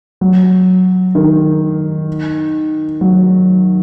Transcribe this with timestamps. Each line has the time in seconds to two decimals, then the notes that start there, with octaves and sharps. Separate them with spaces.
0.21 F#3
1.15 D#3
3.01 F#3